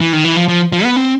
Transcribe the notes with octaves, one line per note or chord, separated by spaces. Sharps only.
E3
D#3
E3
F3
F3
F3
B3
C4